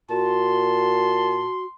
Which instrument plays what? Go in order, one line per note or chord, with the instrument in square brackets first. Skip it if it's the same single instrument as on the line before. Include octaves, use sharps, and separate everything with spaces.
[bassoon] A#2 [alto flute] F#4 [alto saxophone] A5 [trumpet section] C6